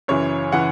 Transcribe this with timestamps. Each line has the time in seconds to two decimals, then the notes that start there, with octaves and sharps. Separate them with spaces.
0.08 F#2 C#3 E3 C#5
0.52 C#3 E3 F#5